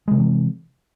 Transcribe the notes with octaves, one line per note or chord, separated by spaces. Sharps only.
C3 E3 G#3 C4